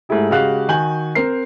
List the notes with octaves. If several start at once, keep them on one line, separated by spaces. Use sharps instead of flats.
G#2 G#3 A3 E4 G4
C#3 G#3 F#4 G4 F5 F#6
D#3 F#4 G#5 G6 F#7
C4 A#4 C7